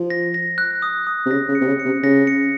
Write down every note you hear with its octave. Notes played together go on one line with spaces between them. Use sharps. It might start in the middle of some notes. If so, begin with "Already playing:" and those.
Already playing: F3
A#6
A#6
F#6
D#6
D#6
C3
C#3 A#6
C#3
C#7
C3
C#3
C#7
C3
C#3 A#6
C#7